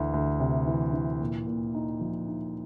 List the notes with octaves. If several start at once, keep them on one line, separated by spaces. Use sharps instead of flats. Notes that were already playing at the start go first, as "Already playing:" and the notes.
Already playing: D2 E3 A3
D2
C3
E3
E3
A#2
A#2
D#4
F3
D#4